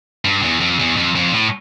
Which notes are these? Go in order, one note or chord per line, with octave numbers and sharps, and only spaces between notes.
G2
E2
F2
E2
F2
F2
A2